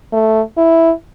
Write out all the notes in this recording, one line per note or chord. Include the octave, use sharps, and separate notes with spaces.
A3
E4